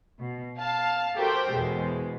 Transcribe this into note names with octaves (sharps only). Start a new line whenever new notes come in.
B2
F5 A5
F#4 G4 A4 A#4 C5 G5
E2 B2 G#3